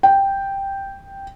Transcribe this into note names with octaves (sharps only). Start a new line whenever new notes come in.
G5